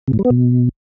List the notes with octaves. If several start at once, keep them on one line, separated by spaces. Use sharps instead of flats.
C3
A2
G3
B3
B2